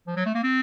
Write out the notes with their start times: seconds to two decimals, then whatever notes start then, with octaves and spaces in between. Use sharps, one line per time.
0.07 F3
0.17 F#3
0.26 A3
0.35 A#3
0.43 C4